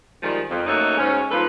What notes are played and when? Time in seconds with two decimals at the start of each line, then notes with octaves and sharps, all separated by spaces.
0.22 D#3 F3 G3 G#3
0.50 F2
0.67 A3 A#3 C#4 D#4 F#4 A4
0.98 G#2 C#4
1.31 E2 G#2 F3 A4 B4